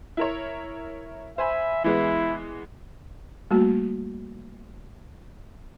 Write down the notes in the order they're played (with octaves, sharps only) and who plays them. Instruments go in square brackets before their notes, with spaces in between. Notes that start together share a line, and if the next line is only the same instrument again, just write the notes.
[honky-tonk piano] E4 A#4 C#5
[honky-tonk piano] C5 G#5 B5 [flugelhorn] E5
[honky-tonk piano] E3 G#3 B3 [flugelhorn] E4
[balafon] G3 A3 A#3 F#4